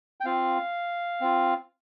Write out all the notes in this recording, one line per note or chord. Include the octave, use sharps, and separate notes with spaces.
G5
C4 F4 F5
C4 F4